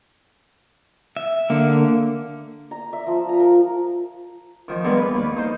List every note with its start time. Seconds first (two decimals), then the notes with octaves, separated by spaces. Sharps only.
1.17 E5
1.50 D3 A#3
2.71 A#5
2.93 E5
3.07 F3
3.29 A#5
3.40 A#4
4.68 D#3 F3
4.84 G2 G#3 A#3 B3
4.97 B4
5.14 D#2
5.36 D#4 C5